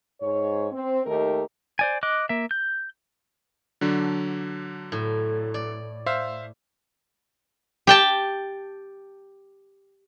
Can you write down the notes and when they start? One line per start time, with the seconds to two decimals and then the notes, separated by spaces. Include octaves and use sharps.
0.21 G#2 C#5
0.72 C4
1.06 D#2 D#3 A3 D#4 G4 A#4
1.79 C5 D5 G#5
2.03 D#5 D6 F#6
2.29 A#3 E5
2.51 G6
3.81 D3 F#3 D4
4.92 A2
5.54 D5
6.06 C5 E5 F5
7.87 G4 G5 A5